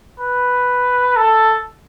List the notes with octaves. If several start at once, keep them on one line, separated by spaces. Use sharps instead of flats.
B4
A4